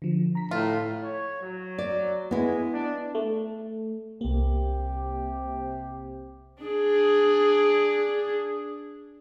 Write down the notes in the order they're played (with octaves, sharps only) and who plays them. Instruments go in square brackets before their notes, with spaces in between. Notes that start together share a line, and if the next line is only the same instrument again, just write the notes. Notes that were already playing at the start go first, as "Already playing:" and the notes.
[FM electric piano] D3 F3
A#5 B6
[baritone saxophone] A2 [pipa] F4
[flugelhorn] C#5
F#3
[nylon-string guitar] D5
[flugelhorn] G#3 [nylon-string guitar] B3 E4
[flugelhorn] D4
[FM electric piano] A3
[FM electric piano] C2 A#3 [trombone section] C3 G4
[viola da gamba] D4 G#4